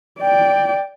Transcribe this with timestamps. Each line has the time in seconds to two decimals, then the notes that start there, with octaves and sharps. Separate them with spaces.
0.20 D5 G5